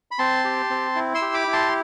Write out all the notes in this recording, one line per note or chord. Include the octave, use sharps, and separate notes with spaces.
B5
C4 A5 C6
G4
C4
E4
C6 E6
G4
B5 D6
E4
A5 C6